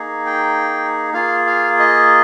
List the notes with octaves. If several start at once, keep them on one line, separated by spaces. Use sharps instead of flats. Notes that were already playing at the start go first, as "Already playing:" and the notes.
Already playing: A#3 D#4 G#4
G5
A#3 F4 G#4 F5
F5
D#5